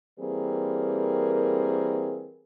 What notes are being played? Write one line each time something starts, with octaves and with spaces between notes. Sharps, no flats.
E3 G3 A#3 C4 G#4 A#4